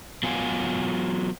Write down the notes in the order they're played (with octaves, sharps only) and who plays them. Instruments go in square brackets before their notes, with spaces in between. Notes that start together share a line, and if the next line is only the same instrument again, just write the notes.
[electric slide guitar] F#3 B3 F4 F5 F#5 G#5